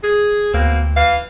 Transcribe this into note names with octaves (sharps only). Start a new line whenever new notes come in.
G#4
D2 B2 A#3 C4
E3 F5